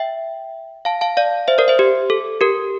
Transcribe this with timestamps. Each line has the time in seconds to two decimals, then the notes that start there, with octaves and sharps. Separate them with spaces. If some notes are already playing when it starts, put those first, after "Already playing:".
Already playing: E5 G5
0.85 F5 A5
1.01 F5 A5
1.17 D5 F5
1.48 C5 E5
1.58 A#4 D5
1.68 C5 E5
1.79 G4
2.10 A4
2.41 G4 A#4